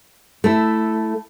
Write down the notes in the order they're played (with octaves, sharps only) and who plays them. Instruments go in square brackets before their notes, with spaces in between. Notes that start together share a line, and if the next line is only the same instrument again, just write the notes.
[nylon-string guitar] A3 E4